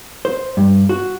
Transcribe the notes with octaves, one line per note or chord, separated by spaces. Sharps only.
C5
G2
F#4